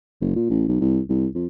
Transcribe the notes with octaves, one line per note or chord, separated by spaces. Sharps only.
F#1
A#2
A1
B1
C2
C2
F2